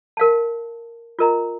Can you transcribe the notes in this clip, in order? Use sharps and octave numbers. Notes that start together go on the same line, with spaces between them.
A#4 F5 A5
F4 A#4 D#5 A#5